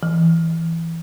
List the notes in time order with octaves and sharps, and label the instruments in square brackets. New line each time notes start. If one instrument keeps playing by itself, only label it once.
[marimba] E3